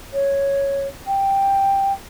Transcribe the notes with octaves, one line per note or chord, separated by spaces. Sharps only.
C#5
G5